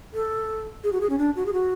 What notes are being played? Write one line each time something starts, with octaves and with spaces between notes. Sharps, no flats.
A4
G#4
F#4
G#4
C#4
D4
F#4
G#4
F#4